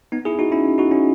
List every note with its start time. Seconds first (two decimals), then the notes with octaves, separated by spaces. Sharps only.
0.12 B3 D#4
0.25 E4 G#4
0.39 D#4 F#4
0.52 C#4 E4
0.78 D#4 F#4
0.91 C#4 E4